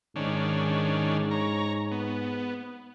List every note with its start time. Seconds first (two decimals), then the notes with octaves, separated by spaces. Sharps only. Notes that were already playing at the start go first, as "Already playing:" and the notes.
0.16 G#2 D#3 C#4 D4
1.31 C#5 A#5
1.92 B3